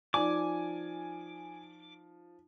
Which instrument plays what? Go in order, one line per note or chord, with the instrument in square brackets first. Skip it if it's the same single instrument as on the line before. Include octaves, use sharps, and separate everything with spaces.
[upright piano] F3 [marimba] D#4 D5 [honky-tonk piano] G#5 [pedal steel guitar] D6